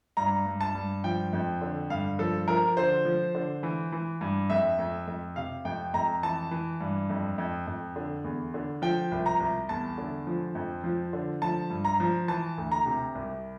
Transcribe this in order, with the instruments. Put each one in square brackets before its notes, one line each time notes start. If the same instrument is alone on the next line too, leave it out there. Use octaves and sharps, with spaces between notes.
[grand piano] G2 A#5
G2
A5
G2
F3 G5
F2
D3
G2 F5
F3 A4
F3 A#4
D3 C5
F3
D3
E3
E3
G2
F2 E5
F2
F2
C3 F5
F2 G5
F2 A#5
E3 A5
E3
G2
F2
F2
F2
D3
E2
D3
F3 G5
C2
A#5
C2
E2 A5
D3
F3
F2
F3
D3
F3 A5
G2
A#5
F3
E3 A5
D2
A#5
C3
C2